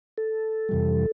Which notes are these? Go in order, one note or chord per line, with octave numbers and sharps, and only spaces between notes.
A4
F2 C3 E3 G3